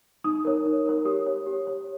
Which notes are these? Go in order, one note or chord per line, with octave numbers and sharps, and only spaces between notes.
D#4 D#6
A#4 C#5
D#4
A#4 C#5
G4 D#6
C#5
G4
C#5